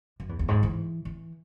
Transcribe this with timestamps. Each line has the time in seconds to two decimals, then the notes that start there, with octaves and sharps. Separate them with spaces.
0.20 F#2
0.29 E2
0.39 E2
0.48 G#2
0.63 E3
1.05 E3